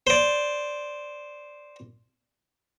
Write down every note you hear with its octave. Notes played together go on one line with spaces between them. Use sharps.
C5 D5